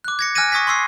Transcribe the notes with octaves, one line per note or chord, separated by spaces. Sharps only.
D6 F#6
G#6 A#6 C#7
G#5 F6 F#6 G#6 A#6 D#7
C#6 D#6 G#6 A#6 B6
C6 C#6 E6 C7